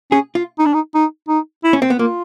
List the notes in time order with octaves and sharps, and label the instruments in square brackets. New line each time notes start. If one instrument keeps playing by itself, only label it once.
[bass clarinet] C#4 [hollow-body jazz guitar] G#4
[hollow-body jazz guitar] F4
[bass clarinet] D#4
D4
D#4
D#4
D#4
E4
[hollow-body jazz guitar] C#4
C4
B3
[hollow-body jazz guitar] A#3 [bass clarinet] F4